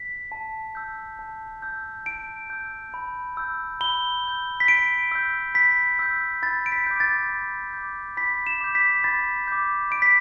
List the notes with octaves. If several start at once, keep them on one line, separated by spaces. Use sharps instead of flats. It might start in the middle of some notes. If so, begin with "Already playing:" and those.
Already playing: B6
A5
E6 G6
A5
E6 G6
A5 D7
E6 G6
B5
E6 G6
B5 G7
E6 G6
B6
B5 D7
E6 G6
B5 B6
E6 G6
B5 A6
D7
B6
D6 G6
A6
B5
D6 G6
B5 B6
E7
D6 G6
B6
B5 A6
D6 G6
B5 D7
B6